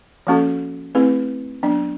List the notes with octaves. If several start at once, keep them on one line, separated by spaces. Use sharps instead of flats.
F3 A#3 C#4 F#4 A4
A3 C4 E4 G#4 B4
F#3 B3 D4